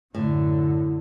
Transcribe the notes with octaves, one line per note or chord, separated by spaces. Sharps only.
F#2 A2 D3